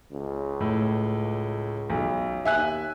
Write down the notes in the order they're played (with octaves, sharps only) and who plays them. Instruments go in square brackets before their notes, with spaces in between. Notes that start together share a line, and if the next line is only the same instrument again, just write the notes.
[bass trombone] C#2
[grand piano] A2
B1
[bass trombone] D#2 [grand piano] E5 G#5 F#6